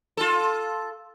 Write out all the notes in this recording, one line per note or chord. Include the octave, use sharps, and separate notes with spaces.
F4 A4